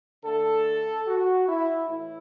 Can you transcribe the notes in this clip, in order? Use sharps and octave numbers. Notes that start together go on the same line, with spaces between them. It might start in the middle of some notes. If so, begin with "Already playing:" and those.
D3 A3 A4
F#4
E4
A2 E3 E4